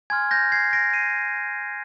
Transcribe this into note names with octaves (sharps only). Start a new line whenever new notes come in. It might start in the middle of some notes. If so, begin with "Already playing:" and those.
G#5 C6 F6 G#6
G6 A#6
G#6 C7
A#6 D7
C7 D#7